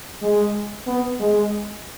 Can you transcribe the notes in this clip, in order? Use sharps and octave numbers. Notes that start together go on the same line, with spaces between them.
G#3
B3
G#3